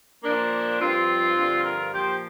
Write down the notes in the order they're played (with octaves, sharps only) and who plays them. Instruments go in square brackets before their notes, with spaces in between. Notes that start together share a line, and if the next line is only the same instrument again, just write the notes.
[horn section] A#2 F3 A#3 D4
G2 F3 C4 F4
G2 D3 F3
F4 A#4
A#2 F3 G4 C5